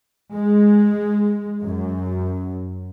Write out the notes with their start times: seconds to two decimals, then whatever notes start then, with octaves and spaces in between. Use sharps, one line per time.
0.34 G#3
1.62 F#2